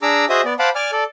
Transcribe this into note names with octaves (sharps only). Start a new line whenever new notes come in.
D4 G#4 A#5 D6 E6
F#4 G#4 C5 D#5 E5 D#6
B3 D5
C5 F5 F#5 A5 B5 D6
D5 G#5 D6 F6
A4 D5